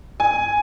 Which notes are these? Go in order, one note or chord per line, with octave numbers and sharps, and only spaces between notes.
G#5